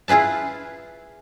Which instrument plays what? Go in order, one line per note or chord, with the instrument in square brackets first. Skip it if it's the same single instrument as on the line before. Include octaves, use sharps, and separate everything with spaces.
[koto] E4 F4 G#4 B4 A5